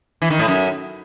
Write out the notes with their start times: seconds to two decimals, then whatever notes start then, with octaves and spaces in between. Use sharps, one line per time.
0.22 E3
0.30 D#3
0.39 A2
0.48 F#2